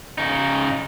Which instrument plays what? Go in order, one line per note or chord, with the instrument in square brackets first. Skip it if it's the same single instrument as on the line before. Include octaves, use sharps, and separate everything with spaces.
[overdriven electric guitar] C#3 D#4